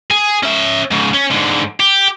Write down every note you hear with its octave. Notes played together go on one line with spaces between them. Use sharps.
G#4
C#4 E5
G#2 C#3
C#4
G#2 D3
G4